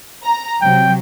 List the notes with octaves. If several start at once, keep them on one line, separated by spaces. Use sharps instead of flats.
A#5
C3 F#3 G5